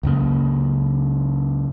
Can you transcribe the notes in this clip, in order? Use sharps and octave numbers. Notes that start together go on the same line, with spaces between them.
C#2 F#2 C#3 A#3